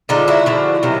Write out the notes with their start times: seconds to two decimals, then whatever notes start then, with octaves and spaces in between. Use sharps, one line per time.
0.09 D3 F3 G#3 D#4 F4
0.28 E4 F#4
0.46 D3 F3 G#3
0.83 C3 D#3 F#3